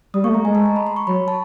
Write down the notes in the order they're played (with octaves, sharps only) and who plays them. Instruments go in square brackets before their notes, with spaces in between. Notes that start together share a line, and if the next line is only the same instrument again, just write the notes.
[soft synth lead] G3 [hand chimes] D#6
[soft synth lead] A#3 [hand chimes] C#6
[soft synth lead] A3
[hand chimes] A#5
[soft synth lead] G#3 [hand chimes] G#5
[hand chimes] A5
A#5
B5
C6
C#6
[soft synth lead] F#3 [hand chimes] B5
[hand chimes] A5